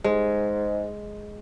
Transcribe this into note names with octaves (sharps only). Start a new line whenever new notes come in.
G#2 G#3